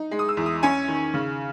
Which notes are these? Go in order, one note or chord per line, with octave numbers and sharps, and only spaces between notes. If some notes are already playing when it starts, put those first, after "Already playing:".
Already playing: D#4
G#3
D#6
E6
E2
D#6
C#4 G#5
D#3
C#3